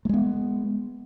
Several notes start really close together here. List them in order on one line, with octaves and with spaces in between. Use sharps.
A3 G#3 B3